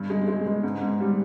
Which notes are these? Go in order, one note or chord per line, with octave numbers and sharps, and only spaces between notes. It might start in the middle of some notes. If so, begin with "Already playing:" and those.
Already playing: G2
G#3
G#3
G#3
G#2
G#2
G3